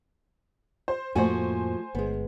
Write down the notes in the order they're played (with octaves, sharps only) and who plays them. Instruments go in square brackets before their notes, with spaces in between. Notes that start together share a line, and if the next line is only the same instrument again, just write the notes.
[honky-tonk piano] C5
[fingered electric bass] F2 A2 A#3 [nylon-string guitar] F3 A3 F#4 [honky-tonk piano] C5 G#5
[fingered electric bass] G1 [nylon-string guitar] G#3 B3